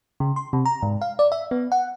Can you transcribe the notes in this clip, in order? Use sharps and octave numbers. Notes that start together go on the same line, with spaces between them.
C#3
C6
C3
A#5
G#2
F5
D5
E5
B3
F#5